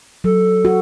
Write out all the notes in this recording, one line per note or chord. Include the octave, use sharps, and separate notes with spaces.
F#3 A4
F#4